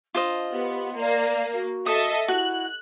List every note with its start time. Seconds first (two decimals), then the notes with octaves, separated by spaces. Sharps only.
0.15 D4 F4 C5 D#5
0.52 B3 G4
0.98 A#3 D5
1.53 F#4
1.86 A4 D#5 E5 D#6
2.28 E4 F#4 F#6